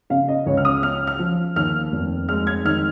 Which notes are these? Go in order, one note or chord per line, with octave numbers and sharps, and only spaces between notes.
C#3 F5
D#5
C#2 C#5
F6
D#6
C#4 F6
F6
F3
D#2 F6
F1
G#3 F6
G#6
D#3 F6